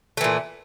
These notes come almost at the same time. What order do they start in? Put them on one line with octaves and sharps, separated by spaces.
A3 E3 A#2